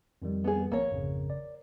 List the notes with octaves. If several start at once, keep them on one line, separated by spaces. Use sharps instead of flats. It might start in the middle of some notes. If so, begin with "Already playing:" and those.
F2 D#3 G3
B3 G#4
A#1 A#3 C#5
G#1 F2 C#3
D5